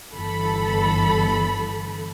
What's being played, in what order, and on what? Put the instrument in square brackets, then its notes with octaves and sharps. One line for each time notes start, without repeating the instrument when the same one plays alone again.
[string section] G1 E3 A4 B5